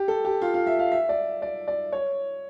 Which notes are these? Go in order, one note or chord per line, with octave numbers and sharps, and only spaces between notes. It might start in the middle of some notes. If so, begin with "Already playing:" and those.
Already playing: G4
A4
G4
F4
F4
E5
F5
E5
D5
D5
D5
C#5